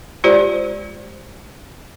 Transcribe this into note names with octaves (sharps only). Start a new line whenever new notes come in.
G#3 F4 G4 C5 D5